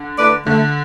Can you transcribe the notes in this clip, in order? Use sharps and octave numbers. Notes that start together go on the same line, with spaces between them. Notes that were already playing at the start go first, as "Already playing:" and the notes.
Already playing: D3
A3 E4 B4 D5
D3 A3